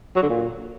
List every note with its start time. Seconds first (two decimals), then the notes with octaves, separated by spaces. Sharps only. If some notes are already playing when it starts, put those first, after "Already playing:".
0.16 F#3
0.23 D3
0.29 A#2